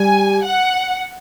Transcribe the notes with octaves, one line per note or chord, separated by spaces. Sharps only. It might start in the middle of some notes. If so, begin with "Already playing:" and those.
Already playing: G3 G#5
F#5